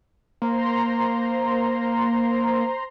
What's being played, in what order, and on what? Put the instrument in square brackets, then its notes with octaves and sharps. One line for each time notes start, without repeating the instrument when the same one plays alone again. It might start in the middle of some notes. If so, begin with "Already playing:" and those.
[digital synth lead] A#3 [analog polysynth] C5 A#5 C6